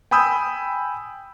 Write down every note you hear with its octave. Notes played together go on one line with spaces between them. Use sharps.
G5 G#5 B5 D#6 E6 G6